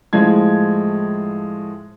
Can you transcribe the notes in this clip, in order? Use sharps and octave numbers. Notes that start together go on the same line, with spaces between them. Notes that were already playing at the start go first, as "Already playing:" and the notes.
A2 F3 G#3 G#6